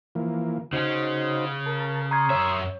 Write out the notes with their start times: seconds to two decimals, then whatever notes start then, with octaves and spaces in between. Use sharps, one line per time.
0.15 E3 F3 A#3
0.73 C#3 C#4 D#4 F#4 C5
1.66 A#4 A5
2.11 A#5 C6 C#6 D#6 F6 G#6
2.30 F#2 C#5 E5